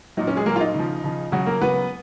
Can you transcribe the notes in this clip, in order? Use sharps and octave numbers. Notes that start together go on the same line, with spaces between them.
A#2 F#3 D#4
C#4
G#3 G#4
A#2 F#3 A#3 A#4
F4
D#4
C#3 F3
C#3 F3
C#3 F#3 F#4
A#3 A#4
C#3 F#3 B3 B4